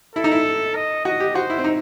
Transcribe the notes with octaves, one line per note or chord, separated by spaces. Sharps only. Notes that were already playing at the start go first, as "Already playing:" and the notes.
E4 A4
D#4
E4
D#5
F#4 D#5
G4
F#4 C5
E4
C4
D#4